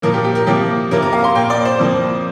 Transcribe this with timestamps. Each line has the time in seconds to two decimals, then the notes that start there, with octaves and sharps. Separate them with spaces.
0.02 A#2 F3 A#3 A#4
0.13 G4
0.24 G4
0.35 A#4
0.47 C3 F3 A#3 G4
0.91 F2 C3 A#3 A#4
1.02 A#4
1.13 F5
1.24 C6
1.35 A#2 A#3 G5
1.50 D5
1.65 C5
1.79 F2 F3 A#3